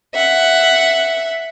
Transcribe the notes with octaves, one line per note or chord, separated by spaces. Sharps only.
E5 F#5